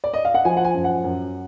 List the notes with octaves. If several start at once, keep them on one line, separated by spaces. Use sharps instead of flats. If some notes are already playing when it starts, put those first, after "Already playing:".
D5
D#5
F5
F#5
F3 G#5
F#5
G#5
F#2
F#5
F#2